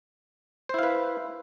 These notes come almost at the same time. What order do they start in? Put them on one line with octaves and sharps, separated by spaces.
C5 E4 F5 B4